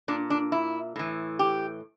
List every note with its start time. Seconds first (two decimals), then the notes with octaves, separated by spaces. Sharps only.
0.08 A#2 D4
0.30 D4
0.52 E4
0.96 A2 E3
1.39 G4